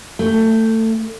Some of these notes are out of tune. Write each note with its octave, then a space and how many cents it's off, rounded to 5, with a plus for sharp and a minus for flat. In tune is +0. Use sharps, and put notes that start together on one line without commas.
A3 +20 G#5 -40